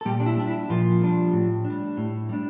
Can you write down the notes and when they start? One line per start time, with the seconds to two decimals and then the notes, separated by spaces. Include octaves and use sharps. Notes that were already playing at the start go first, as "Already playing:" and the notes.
0.01 A4
0.05 A#2 G3 G4
0.20 D4
0.26 E4
0.37 G3 D4
0.48 E4
0.70 A#2 F3 F4
1.02 G3 D4
1.33 A2
1.65 D4
1.70 G3
1.97 A2
2.29 G3 D4